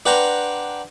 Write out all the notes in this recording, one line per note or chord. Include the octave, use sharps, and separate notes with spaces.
D4 B4 F#5 G5 A#5 C6